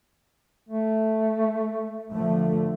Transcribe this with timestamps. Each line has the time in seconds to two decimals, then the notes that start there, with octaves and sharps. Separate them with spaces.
0.69 A3
2.12 D3 F3 A3